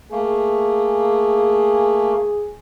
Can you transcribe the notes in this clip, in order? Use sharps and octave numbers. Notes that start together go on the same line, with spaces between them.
A3 A#3 G#4